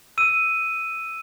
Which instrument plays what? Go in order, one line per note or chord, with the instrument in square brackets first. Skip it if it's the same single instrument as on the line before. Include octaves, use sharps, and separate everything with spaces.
[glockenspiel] E6 D#7